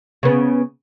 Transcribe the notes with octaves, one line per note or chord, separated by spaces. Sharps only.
C#3 B3